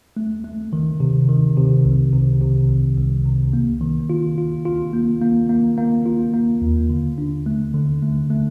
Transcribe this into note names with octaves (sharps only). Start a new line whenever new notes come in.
A3
A3
D#3
C3
D#3
C3
C2
C3
C3
C2
C2
C3
A#3
D#3
F4
F4
F4
A#3
A#3
A#3
A#3
F4
A#3
D#2
D3
D4
A3
D3
A3
A3